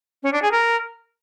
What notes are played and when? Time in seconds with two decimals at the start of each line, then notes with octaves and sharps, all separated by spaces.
0.23 C#4
0.33 D4
0.42 G#4
0.52 A#4